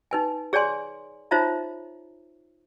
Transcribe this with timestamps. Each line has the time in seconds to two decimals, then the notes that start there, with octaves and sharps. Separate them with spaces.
0.11 D#4 B4 G#5
0.53 G#4 C#5 D5 G#5 C6
1.31 D#4 F4 C5 C#5 E5 A#5